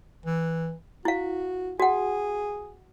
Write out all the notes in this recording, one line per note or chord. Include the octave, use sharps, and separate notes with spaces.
E3
E4 F#4 F5
F#4 G#4 F#5